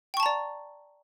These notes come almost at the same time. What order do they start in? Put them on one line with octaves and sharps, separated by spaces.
G5 C#6 A5 A#5 D5